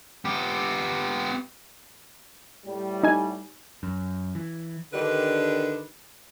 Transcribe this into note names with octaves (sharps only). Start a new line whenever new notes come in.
B3 G4
A2 G3
D#4 G#5
F#2
E3
D3 D#3 D4 G4 B4